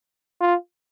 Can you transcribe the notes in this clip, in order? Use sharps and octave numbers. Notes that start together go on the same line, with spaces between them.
F4